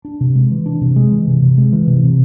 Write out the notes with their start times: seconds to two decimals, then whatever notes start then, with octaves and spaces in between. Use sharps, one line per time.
0.05 D4
0.21 C3
0.35 G#3
0.51 E3
0.66 D4
0.81 C3
0.96 G#3
1.11 E3
1.27 C3
1.42 C3
1.58 G#3
1.73 E3
1.87 C3
2.04 C3